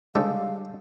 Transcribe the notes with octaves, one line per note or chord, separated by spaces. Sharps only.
G2 C#3 G3 G#3 G4 A4 F5